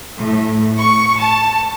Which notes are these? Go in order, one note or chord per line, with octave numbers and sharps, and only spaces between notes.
A2
C#6
A5